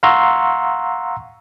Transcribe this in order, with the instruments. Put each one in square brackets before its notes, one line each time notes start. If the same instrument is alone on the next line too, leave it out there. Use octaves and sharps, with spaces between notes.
[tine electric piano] F5 F#5 A#5 C6 C#6 E6